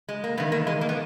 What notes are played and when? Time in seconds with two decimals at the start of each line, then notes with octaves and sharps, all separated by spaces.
0.09 G#3
0.24 A#3
0.37 E2 D#3 B3
0.52 A#3
0.67 G#3
0.81 A#3
0.89 B3